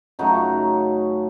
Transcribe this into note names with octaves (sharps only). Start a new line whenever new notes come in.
F#2 C#3 F#3 A3 D#4 F#4